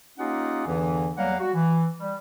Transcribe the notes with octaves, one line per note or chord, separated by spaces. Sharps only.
A#3 C#4 D#4 F4 G4 F#5
E2 G2 D3 E3
E2 F#3 G3 A#3 F5 F#5
F#4
E3
G3